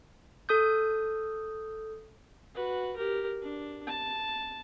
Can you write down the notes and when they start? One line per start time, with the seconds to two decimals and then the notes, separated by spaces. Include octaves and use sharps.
0.49 A4 D#6 G6
2.54 F#4 B4
2.96 G4 A#4
3.42 D4
3.87 A5